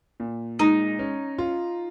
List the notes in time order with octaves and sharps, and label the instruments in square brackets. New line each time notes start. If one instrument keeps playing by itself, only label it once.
[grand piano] A#2
[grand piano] G#3 [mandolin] D#4
[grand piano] C#4
F4